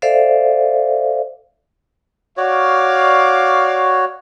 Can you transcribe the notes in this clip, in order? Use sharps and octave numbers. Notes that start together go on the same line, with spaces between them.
A4 C5 D5 E5 F5
F#4 C#5 D5 F5